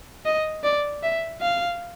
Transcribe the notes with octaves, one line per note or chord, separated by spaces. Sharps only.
D#5
D5
E5
F5